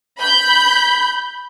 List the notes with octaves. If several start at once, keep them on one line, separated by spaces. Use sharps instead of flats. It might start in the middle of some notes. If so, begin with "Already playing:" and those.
B5 G6